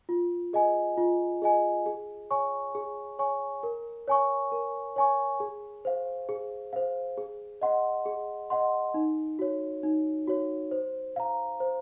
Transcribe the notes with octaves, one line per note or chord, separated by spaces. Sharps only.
F4
G#4 D#5 G#5
F4
G#4 D#5 G#5
G#4
C#5 G#5 C#6
G#4
C#5 G#5 C#6
A#4
C#5 G#5 C#6
A#4
C#5 G#5 C#6
G#4
C5 F5
G#4
C5 F5
G#4
D#5 F#5 C6
G#4
D#5 F#5 C6
D#4
F#4 C#5
D#4
F#4 C#5
C5
F5 A#5
C5